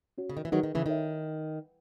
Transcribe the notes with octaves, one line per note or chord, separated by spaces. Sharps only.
C#4 F#4 C#5
C#3
D#3
E3
D#3 F#3 D#4 G#4 B4 D#5
D#3
C#3 E3
D#3 D#4 A4 C#5 E5